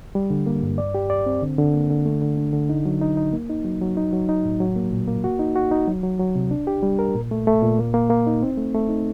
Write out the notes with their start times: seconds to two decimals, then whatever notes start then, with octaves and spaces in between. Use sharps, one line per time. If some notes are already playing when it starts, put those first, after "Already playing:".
0.15 G3
0.30 D3
0.46 A#3
0.63 G2
0.78 D5
0.95 G4
1.10 D5
1.26 C4
1.42 D3
1.58 D3
1.74 A#3
1.90 D3
2.05 A3
2.21 D3
2.37 D4
2.53 D3
2.69 D#4
2.85 F#3
3.02 D#4
3.17 D#4
3.33 A#3
3.49 D#4
3.65 F#3
3.81 F#3
3.97 D#4
4.13 F#3
4.29 D#4
4.45 A2
4.60 F#3
4.76 A#3
4.92 A#2
5.08 A#3
5.24 F#4
5.39 D#4
5.56 F#4
5.71 D#4
5.88 F#3
6.03 F#3
6.19 F#3
6.35 C3
6.51 D4
6.67 G4
6.83 G3
6.99 A#4
7.14 A#2
7.31 A3
7.47 A3
7.63 A#2
7.79 A#3
7.94 A#3
8.10 A#3
8.27 D#4
8.42 C4
8.58 A3
8.74 A3
8.89 D#4